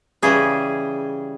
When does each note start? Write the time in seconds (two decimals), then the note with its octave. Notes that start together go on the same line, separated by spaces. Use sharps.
0.22 C#3 E3 G3 G#4